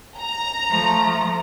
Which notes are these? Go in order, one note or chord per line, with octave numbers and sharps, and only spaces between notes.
A#5
F3 A3